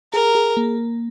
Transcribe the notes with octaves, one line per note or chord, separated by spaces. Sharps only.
G#4 A#4
G#4
A#3